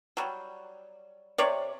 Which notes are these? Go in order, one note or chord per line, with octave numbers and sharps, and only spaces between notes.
F#3 G3
C3 C#5 D5